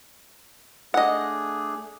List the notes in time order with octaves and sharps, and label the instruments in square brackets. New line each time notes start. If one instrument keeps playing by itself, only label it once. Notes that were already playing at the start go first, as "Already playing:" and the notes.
[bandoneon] A3 D4 G#4 [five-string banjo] D#5 F#5